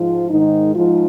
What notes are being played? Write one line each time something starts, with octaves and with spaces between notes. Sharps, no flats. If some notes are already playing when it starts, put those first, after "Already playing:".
Already playing: G#2 F3 F4
G#2 D#3 D#4
G#2 F3 F4